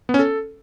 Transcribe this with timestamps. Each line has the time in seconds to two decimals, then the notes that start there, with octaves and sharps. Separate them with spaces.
0.09 B3
0.14 C#4
0.19 A4